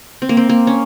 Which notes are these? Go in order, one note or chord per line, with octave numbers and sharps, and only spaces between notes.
C4
A#3
C4
A#3
C#4